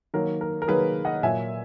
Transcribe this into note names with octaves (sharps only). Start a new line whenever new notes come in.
D#3 F#3 A#3 A#4
A#4
A#4
D#3 F#3 A#3 G#4 B4
D#5 F#5
A#2 F#3 A#3 E5 G#5